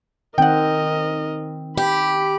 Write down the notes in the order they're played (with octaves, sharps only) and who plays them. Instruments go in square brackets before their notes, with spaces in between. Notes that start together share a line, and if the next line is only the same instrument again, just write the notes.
[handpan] D#3 C4 [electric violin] A#4 D#5 [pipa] F#5 G5
[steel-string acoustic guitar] G4 [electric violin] B5